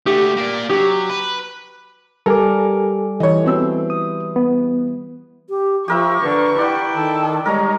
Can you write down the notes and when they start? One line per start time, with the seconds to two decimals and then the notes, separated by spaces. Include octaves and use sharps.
0.06 A3 F#4 G4
0.37 A#3 D5
0.69 F#3 G4
1.09 B4
2.26 G3 A4 A#4 G#5 D6
3.20 E3 C#5 D#5
3.44 B2 C4 E6
3.90 D#6
4.36 B3
5.50 G4
5.88 F3 G4 A#4 E5 C#6
6.21 D3 B4
6.58 E4 D5 F#5 G5
6.94 D#3 A4
7.46 G3 G#3 D#4 A#4 C#5 A#5